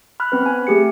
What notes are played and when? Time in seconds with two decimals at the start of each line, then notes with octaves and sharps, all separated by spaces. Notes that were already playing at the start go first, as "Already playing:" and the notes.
0.20 B5 F6 F#6
0.32 B3 C4 B4
0.46 G#5
0.67 A3 G4 G#4 C#7